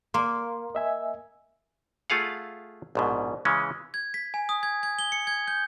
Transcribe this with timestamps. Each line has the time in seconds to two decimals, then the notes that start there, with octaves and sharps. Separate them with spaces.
0.14 A#3 C6
0.75 D#5 E5 G#5
2.10 A3 F4 G#4 F5 F#5
2.95 A#1 G#2 B2
3.45 C#3 E3 G#3 C#4
3.94 G#6
4.14 B6
4.34 G#5
4.49 D#6
4.63 G#6
4.83 G#6
4.99 G7
5.12 C#7
5.27 G#6
5.48 G6